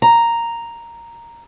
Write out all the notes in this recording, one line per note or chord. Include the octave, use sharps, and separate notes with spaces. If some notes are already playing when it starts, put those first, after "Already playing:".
A#5